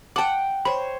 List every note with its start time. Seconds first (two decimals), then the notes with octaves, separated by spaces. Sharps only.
0.16 F#5 G5 A5 D6
0.65 C5 C#5 B5